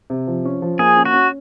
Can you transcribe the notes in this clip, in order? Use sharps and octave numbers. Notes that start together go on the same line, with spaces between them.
C3
F3
C#4
F3
A#3 G#4
C#4
F#4
C#4